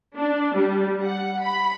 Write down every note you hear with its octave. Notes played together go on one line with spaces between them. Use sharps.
D4
G3
F#5
B5